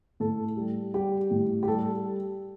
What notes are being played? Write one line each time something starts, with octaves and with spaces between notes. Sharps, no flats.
A2 A4
G3
G3 G4
A2
G4
G3 A4